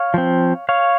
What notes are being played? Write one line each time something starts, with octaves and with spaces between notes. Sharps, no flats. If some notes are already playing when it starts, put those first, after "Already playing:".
Already playing: C#5 F5
F3 C4
C#5 F5